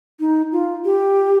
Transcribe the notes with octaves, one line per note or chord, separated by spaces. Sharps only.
D#4
F4
G4